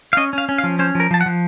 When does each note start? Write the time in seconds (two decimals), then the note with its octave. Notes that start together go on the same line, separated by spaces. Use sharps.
0.13 F5
0.17 C#4 D#5
0.33 C#4 F5
0.49 C#4
0.58 F5
0.64 F3
0.79 C#4 C5
0.95 F3 A#4
1.11 F3 A5
1.21 F#5
1.26 F3